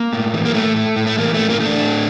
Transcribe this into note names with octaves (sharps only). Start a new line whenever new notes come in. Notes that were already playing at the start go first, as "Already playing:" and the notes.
Already playing: A#3
A2
E3
A#3
A2 A3
A3
A2
A3
E3 A#3
A2 A3
A#3
A3
D4
A2